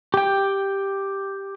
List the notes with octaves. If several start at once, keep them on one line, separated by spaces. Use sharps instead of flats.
G4 G5